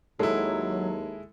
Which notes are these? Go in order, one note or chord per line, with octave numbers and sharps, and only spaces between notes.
D#2 F#3 G#3 E4 A4